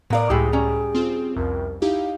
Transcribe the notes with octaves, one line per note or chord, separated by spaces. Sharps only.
A2 B3 A#4 D5 F5
C#2 A2 G#3 E4 G4 G#4
G3 C#4 A#5
C4 F4
C2 F2 A#4
D#4 E4 G4 F5